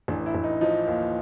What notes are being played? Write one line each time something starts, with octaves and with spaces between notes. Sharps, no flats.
A1 D4
E4
A1
D#4
F3 D#4
D#2